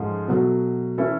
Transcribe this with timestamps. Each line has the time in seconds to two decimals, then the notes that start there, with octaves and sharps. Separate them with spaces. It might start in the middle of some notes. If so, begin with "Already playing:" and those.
Already playing: G#2 F3 A3 C#4
0.28 B2 F#3 A3
0.98 E3 A3 C#4 E4 A4